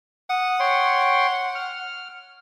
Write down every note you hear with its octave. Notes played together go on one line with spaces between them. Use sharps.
F#5 D#6
C#5 G5 C6
F6